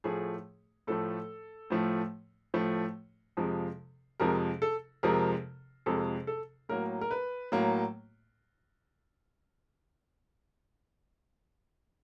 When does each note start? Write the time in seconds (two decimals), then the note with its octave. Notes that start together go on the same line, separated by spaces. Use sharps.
0.04 A2 F3 A3 G#4
0.87 A2 F3 A3 A4
1.70 A2 F3 A3
2.54 A2 F3 A3
3.37 F2 C3 F3 G#3
4.20 F2 C3 F3 G#3 A#4
4.62 A4
5.03 F2 C3 F3 G#3 A#4
5.86 F2 C3 F3 G#3 A4
6.27 A4
6.69 A2 F#3 A#3 A#4
7.01 A#4
7.11 B4
7.52 A2 F#3 A#3